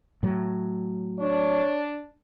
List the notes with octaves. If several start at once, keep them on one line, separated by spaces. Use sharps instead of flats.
A2 F#3
D4 C#5